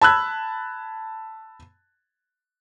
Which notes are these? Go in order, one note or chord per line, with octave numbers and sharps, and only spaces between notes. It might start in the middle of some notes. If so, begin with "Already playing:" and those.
A5 B5 E6 F#6 G#6